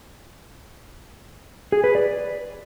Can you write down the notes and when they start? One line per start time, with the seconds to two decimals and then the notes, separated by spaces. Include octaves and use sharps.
1.72 G#4
1.84 B4
1.95 D5